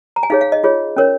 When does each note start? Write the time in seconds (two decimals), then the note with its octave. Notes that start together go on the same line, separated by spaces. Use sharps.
0.16 A#5
0.23 G#5
0.30 D#4 G#4 C#5 F5
0.41 F5
0.52 D#5
0.64 F4 G#4 C#5
0.97 C#4 A#4 C#5